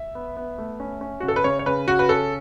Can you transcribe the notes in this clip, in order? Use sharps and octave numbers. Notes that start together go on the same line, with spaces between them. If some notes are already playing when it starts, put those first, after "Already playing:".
Already playing: E5
B3
B3
A3
C#4
C#4
C#3 F#4
A4
B4
C#3 C#5
C#5
C#3 B4
C#3 F#4
B4
C#4 A4